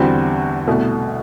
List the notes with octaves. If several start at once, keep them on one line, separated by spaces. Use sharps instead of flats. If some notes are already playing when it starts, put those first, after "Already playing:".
Already playing: E2 D3 G3 C4 F#4
C2 B2 A3